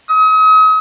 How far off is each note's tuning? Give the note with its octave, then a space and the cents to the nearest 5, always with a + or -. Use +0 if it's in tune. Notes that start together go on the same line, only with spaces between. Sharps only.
D#6 +40